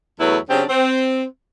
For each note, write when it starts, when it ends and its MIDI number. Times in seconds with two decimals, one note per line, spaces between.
0.20 0.38 40
0.20 0.38 54
0.20 0.38 57
0.20 0.38 64
0.20 0.38 71
0.49 0.63 49
0.49 0.63 54
0.49 0.63 60
0.49 0.63 62
0.49 0.63 67
0.70 1.24 60